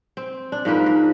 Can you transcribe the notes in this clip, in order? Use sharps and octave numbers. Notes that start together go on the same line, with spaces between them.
C4
D4
G#2 F3 A#3 B4
G#2